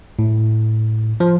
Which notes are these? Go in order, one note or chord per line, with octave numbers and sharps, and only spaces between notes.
A2
F3